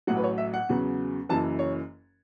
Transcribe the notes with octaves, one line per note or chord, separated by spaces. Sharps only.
A1 A2 F#3 F#5
B4
C#5
E5
F#5
E2 C#3 F#3
F#1 F#2 E3 A5
C#5